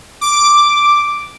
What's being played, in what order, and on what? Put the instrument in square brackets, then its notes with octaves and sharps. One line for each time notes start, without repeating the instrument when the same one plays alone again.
[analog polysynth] D6